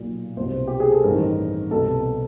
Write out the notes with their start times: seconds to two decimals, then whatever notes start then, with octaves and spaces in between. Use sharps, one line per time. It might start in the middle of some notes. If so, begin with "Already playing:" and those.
Already playing: B1 A#2
0.37 C2 B2 C5
0.67 G4
0.80 G#4
0.92 A4
1.04 A1 G2 D#3 A#4
1.71 C2 B2 A4